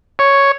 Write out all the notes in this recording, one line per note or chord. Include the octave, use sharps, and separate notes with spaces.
C#5